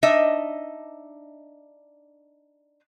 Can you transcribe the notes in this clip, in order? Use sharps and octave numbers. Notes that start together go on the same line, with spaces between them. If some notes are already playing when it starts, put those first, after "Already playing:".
D4 D#4 D#5 E5